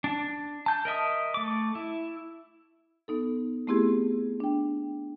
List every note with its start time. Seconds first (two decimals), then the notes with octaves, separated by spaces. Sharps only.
0.04 D4
0.66 A5 G6
0.85 A#4 D#5 E5 D#6
1.34 A3 D6
1.75 E4
3.08 B3 D#4 A4
3.67 A3 B3 C4 E4 G4 G#4
4.40 D4 G5